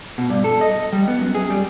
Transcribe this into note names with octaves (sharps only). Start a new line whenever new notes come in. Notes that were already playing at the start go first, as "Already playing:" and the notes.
B2
G2
A4
D#5
G3
B3
F#2
G#4
G3